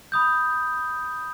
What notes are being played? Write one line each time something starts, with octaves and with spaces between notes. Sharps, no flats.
B5 D#6 G6